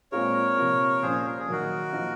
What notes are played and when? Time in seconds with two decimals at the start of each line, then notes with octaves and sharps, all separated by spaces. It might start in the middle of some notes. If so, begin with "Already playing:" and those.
0.12 A#2 G#3 C4 F4 G#4 A#4 C#5
0.57 C3 F3 A#3
1.02 A#2 F3 A#3 C#4 G#4 C5
1.26 A#4
1.39 G#4
1.47 D#3 F#3 A#3 F#4 A#4
1.92 F3 A#3 D#4